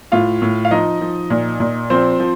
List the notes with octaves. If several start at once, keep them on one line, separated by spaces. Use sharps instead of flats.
A2 F4 F5
A2
F5
F3 D#4 D#5
F3
A#2
A#2
F3 C4 C5
F3